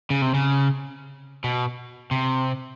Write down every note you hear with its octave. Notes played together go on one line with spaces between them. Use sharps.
C#3
C3
C#3
B2
C3